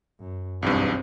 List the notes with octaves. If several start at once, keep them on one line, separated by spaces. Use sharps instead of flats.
F#2
B1 E2 G2 C4